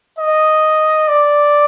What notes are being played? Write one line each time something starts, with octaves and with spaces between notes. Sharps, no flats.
D#5
D5